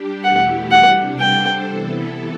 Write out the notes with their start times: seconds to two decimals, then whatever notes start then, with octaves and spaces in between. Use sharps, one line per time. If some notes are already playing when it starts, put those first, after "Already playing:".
Already playing: G3 D4 G4
0.23 E2 B2 A3 E4 G4 F#5
0.71 C3 G3 D4 F#5
1.19 G3 D4 A4 C5 G5
1.67 C3 E3 B3 E4 A4